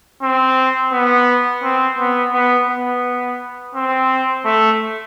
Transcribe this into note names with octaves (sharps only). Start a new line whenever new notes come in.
C4
B3
C4
B3
B3
B3
C4
A3